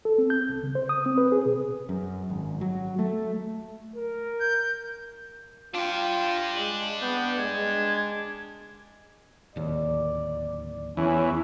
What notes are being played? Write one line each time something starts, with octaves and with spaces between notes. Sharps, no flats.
A4
C4
G6
C2
C#3
C5
D#6
C4
B4
G#4
B2
F#2
G#1
F#3
A3
A#4
G6
D4 F4 G5
G#3 F#7
B3 G6
G#3 G#6
D1 D#2 D5
E2 C#4